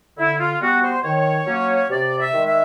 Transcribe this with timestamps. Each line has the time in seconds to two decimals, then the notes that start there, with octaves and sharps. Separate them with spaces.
0.17 D3 E4
0.38 F4
0.61 G3 B3 F#4
0.82 C5
1.03 D#3 C#5
1.47 F#3 A#3 C#4
1.90 C3 D5
2.19 E5
2.33 D#3 G#3
2.47 E5